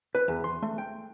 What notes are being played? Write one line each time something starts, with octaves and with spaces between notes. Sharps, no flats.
B4
E2
C6
A3
G5